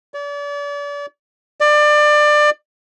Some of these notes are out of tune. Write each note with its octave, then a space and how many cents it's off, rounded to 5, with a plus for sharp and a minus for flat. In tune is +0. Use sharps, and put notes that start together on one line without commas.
D5 -40
D5 +25